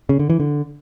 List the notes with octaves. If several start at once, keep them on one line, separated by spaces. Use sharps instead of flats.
C#3
D3
E3
D3